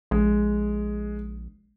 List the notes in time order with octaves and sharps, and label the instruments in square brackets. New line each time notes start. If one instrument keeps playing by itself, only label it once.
[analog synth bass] A#1 [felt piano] G#3